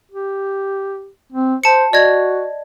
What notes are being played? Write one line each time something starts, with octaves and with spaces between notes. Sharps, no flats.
G4
C4
C5 A5 C#7
F#4 D5 D#5 G#6